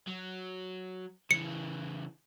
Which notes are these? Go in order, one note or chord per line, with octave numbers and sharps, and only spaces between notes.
F#3
C#3 E3 C#7